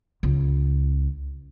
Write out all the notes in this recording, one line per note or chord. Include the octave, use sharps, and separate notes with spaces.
C#2